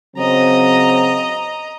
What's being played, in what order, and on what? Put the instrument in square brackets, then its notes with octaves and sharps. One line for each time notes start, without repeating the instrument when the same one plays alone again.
[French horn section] C#3 F#3 C4 [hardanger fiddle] D#5 A#5